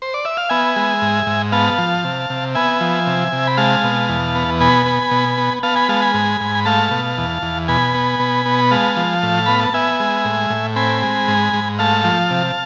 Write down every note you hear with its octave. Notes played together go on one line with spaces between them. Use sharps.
C5
D5
E5
F5
B3 E5 G#5
G#3
G#2
G#2
B3 F5 A5
F3
C3
C3
B3 E5 G#5
F3
C3
C3
B5
G#3 F5 A5
B2
E2
B3
B2 G#5 B5
B3
B2
B3
B3 F5 A5
G#5 B5
G#3 F5 A5
G#5 B5
G#2
G#2
B5
A3 F5 A5
B2
E2
E2
B2 G#5 B5
B3
B2
B3
B5
G#3 F5 A5
F3
A2
B3 B5
A5
B3 E5 G#5
G#3
A2
A2
C4 G#5 B5
G#3
G#2
G#2
A3 F5 A5
F3
C3